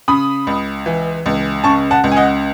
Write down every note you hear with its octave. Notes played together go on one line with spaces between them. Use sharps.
C#3 B5 D#6
C#2
E3
C#2
C#3 A5 C#6
F#5 A5
C#2
G#5
D#5 F#5